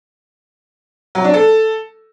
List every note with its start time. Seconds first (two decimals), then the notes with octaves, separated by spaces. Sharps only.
1.15 F#3
1.24 D4
1.34 A4